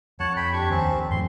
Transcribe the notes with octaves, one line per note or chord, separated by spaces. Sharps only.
F2 C#5 F#5 A5
G5 B5
D4 G4 C#6
D#2 C4 C#4
F2
F1 F#2 F3 C6